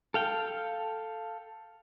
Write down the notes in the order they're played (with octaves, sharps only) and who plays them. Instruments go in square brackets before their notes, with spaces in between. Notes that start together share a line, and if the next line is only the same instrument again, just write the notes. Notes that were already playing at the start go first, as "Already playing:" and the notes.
[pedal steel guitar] A4 F5 G5